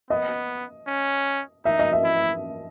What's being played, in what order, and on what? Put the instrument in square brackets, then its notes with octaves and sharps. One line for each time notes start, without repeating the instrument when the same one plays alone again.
[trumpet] B3 [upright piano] D#5
[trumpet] C#4
[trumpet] D#4 [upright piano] E5
[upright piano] D#5
E5
[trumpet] E4